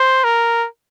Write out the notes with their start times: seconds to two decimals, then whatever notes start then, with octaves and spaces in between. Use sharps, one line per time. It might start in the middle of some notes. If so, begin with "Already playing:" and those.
Already playing: C5
0.24 A#4